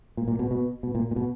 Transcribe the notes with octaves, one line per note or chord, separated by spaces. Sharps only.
A#2
A#2
B2
B2
B2
A#2
A#2
B2